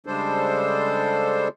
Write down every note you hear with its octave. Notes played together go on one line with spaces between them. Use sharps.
C#3 G3 G#3 D4 A4 C5